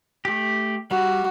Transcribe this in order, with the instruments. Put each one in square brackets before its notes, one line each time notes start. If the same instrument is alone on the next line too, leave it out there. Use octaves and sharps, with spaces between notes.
[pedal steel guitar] A3 G4
[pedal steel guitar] G3 [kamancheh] F#4